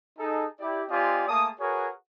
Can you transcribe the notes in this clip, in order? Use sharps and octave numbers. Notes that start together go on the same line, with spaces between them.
D#4 G#4 A4
E4 G4 D5
C4 F4 G4 D5 D#5 G#5
A3 A#3 G#4 A5 D#6
F#4 G#4 A#4 B4 C#5